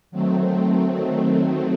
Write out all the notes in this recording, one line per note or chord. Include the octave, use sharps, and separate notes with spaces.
D#3 F#3 A3 C4